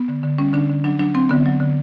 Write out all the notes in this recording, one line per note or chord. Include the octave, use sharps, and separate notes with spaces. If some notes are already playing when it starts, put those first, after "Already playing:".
Already playing: B3
D3
D3
G3 C#4
D3 D4
D3
F#3 D4
F#3 D4
F#3 C4
D3 B3
F#3
D3